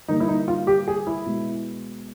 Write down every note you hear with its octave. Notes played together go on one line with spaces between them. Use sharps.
D3 G3 A#3 D#4
E4
D#4
F4
G4
G#4
E4
B2 G#3